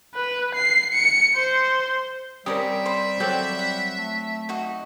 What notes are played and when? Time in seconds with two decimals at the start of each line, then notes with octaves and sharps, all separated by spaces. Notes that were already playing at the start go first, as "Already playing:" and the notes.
0.15 B4
0.55 C7
0.93 C#7
1.36 C5
2.46 G3 C4 C#4 G4 A#4 E5 A#5 D#6
2.86 C5 B5 D6
3.20 F#3 G3 C4 A4 D5 G5
3.59 F#5
3.98 A3
4.49 D#4 F#4 D#5